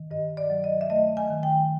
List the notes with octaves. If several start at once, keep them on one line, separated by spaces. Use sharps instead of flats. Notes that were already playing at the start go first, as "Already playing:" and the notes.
Already playing: D#3
G2 D#5
D5
F#3
D#5
E5
A3 D#5
G#5
D#3
G5